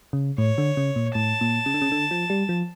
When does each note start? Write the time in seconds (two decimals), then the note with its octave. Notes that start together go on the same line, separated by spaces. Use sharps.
0.13 C#3
0.38 A2 C#5
0.58 D3
0.77 C#3
0.96 A#2
1.15 A2 A5
1.41 A#2
1.66 C#3
1.74 D3
1.82 C#3
1.92 D3
2.11 F3
2.30 G3
2.49 F3